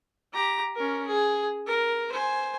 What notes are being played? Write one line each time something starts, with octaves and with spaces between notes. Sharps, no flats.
G4 A#5
C#4 A#4
G#4
A#4
C5 G#5